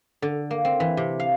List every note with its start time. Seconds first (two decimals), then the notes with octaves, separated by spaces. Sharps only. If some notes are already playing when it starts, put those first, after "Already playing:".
0.22 D3
0.51 A#3
0.65 C4
0.80 E3
0.97 C3
1.20 F5